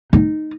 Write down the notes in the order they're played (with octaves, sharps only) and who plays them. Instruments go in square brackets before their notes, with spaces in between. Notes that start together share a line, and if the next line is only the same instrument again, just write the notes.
[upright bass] D#4